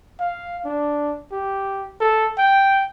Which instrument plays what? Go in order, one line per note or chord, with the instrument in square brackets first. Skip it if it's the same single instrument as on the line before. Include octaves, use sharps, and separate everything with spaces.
[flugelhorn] F5
D4
G4
A4
G5